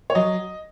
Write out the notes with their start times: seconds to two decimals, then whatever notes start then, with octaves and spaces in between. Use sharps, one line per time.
0.10 C#5
0.15 F#3 D#5